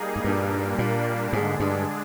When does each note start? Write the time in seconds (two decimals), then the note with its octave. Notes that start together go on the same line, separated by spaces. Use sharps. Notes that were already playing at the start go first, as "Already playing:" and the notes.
Already playing: G3 A#3 D#4 G#4
0.16 G#2
0.24 G2 A#2 G3 A#3 D4
0.79 A#2
1.33 G#2 D3 G#3 D4 G#4
1.60 G2